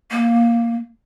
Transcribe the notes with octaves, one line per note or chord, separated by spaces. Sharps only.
A#3